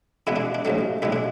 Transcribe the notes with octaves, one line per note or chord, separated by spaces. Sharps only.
E2 B2 G#3 B3 E4
D4
D4
A1 G#2 F#3 A3
B1 A2 G#3 E4
D4